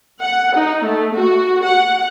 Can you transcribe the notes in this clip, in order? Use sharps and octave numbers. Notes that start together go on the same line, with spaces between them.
F#5
D#4
A3
F#4
F#5